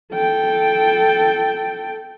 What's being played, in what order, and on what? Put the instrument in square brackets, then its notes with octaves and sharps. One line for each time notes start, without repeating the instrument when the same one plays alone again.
[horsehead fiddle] A4 G5